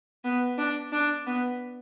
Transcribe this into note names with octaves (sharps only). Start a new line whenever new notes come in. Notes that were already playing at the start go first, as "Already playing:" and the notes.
B3
D4
D4
B3